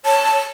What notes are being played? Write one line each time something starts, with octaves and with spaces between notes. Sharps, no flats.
C#5 A5